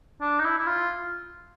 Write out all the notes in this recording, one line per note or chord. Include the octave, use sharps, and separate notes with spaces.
D4
D#4
E4
E4
F4